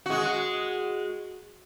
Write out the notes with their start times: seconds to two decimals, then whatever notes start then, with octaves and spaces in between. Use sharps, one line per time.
0.06 G#3 F#4